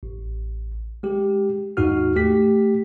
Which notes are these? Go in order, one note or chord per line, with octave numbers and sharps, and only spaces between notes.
A1
G#3 G4
D#2 G#2 D#4 F#4 F6
A3 G4 B6